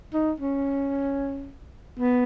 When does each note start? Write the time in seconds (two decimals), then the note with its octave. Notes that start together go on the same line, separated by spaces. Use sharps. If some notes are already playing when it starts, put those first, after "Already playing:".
0.14 D#4
0.40 C#4
1.99 B3